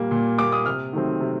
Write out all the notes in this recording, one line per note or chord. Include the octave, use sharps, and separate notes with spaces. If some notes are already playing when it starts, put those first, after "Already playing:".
Already playing: A#2 G3 A#3
A#2
G3 A#3 D6
D#6
C3 F6
D#3 F#3 A3 C4
C3